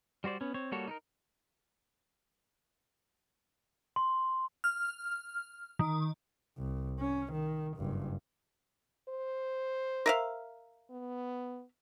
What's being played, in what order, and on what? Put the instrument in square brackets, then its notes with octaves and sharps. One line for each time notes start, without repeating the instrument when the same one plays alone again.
[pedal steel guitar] G3 F#4 C5 D5
B3 C#4
C4 C#5
G3 A#3 F#4 A4 C#5
D#4 A4 A#4
[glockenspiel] C6
[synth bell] F6
D#3
[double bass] C2
C#4
D#3
F#1 G2
[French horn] C5
[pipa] A#4 E5 F5
[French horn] B3